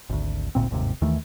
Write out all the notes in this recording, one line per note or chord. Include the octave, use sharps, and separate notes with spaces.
G#1 D2
G#1 D2 A#2 C4
G1 D#2 G#2 C3
D#2 D#3 E3 A3